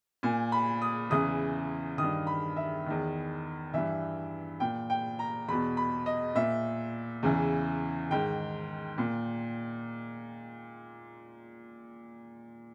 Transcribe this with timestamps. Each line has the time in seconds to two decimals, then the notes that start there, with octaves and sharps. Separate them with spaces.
0.23 A#2 G#5
0.52 B5
0.82 D#6
1.10 E2 C#3 E3 D#6
1.98 D#3 D#6
2.03 G2
2.27 B5
2.56 E5
2.86 E2 D#3
3.74 G2 E3 E5
4.60 A#2 G5
4.90 G5
5.19 A#5
5.48 E2 B2 B5
5.77 B5
6.06 D#5
6.35 A#2 E5
7.23 E2 C#3 E3
8.10 G#2 D#3 G5
8.98 A#2